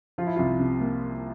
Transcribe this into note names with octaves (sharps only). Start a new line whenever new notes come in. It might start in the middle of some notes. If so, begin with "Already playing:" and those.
F3 F4
E4
C2 F4
C3
A#3